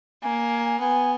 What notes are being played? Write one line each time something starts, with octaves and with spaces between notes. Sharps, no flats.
A#3 G#5
B3 G#5